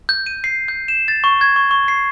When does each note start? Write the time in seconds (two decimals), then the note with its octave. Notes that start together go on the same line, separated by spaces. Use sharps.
0.09 G6
0.26 D#7
0.44 C7
0.68 G6
0.88 E7
1.08 A6
1.24 C#6
1.41 G#6
1.56 C#6
1.71 C#6
1.88 C7